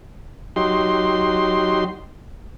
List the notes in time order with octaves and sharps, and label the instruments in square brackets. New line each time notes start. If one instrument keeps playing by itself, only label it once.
[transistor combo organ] F#3 D#4 G4 C6